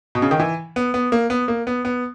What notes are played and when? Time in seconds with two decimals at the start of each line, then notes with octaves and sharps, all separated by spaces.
0.15 B2
0.22 C#3
0.31 D#3
0.40 E3
0.76 B3
0.94 B3
1.12 A#3
1.30 B3
1.48 A#3
1.67 B3
1.85 B3